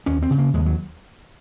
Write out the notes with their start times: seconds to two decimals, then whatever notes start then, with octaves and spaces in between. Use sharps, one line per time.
0.06 D#2 C#4
0.22 C4
0.31 C#3
0.38 A#3
0.54 D#2 G#3
0.66 F#3